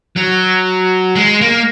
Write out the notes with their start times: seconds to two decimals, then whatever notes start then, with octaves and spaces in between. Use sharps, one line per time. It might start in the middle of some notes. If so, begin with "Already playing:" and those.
0.17 F#3
1.16 G#3
1.41 A#3